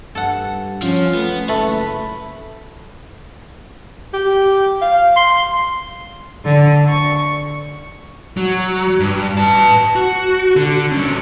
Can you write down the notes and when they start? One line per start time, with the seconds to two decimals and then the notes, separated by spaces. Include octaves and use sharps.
0.15 G2 A4 F#5
0.83 F3 C#4
1.14 A3 B3
1.49 F#1 A3 B4
4.14 G4
4.82 F5
5.16 C6
6.45 D3
6.87 C#6
8.37 F#3
9.00 G2
9.38 B4 A5
9.96 F#4
10.56 D3
10.92 G3 C#4